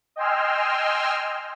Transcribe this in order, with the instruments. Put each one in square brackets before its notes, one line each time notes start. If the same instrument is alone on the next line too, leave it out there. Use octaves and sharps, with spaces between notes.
[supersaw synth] D#5 G5 G#5 C6 E6 F6